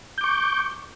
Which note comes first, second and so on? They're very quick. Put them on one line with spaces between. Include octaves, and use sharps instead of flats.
G6 D6 C#6